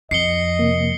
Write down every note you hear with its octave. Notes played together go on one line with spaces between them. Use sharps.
F2 D#5 C7 C#7 G7
C3 A#3